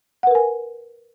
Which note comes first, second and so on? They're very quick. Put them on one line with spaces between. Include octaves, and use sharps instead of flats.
F#5 B4 A#4 G#5